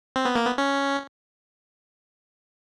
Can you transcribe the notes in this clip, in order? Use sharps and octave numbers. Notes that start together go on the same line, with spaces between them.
C4
B3
A#3
B3
C#4